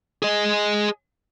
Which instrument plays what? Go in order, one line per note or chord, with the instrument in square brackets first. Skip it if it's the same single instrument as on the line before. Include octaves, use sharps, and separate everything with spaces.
[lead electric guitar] G#4 D#5